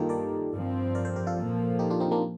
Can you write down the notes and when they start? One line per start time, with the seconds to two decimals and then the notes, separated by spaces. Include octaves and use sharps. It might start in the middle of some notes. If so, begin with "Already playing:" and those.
Already playing: G2 D#3 A#3 D#4 F4 G4 A4
0.09 A#4 D5
0.52 G2 F3 C4
0.95 A#4 D5
1.05 A4 C5
1.16 G4 A#4
1.27 F4 A4
1.37 A#2 F3 A#3
1.79 D#4 G4
1.90 D4 F4
2.00 C4 D#4
2.11 A#3 D4